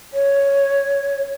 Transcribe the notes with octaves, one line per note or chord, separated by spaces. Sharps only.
C#5